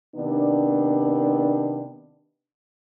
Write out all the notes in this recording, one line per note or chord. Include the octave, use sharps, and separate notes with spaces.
C3 D#3 B3 D4